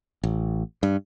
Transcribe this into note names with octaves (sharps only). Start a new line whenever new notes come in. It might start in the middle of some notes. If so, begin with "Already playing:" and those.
A1
G2